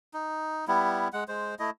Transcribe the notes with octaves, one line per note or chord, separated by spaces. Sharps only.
D#4
G3 B3 E4
G#3 F#5
G#3 C5
A3 E4 D#5